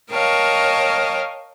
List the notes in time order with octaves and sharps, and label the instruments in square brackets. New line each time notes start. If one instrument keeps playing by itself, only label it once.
[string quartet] A#4 C#5 D#5 F5 G5 A5